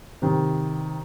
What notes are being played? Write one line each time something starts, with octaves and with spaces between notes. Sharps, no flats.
C3 D#3